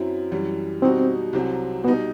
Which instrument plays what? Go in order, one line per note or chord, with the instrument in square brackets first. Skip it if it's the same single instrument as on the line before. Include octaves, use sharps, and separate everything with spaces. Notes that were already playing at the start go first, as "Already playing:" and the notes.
Already playing: [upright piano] F#2 F#3 C4 E4
F#2 E3 G3
[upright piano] B2 G3 D#4 F#4 [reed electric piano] C4
[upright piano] C2 C3 F#3 C4
[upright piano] B2 G3 D#4 [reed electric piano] B3